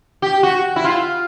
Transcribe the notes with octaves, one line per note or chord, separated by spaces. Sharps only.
G4
F#4
E4
F4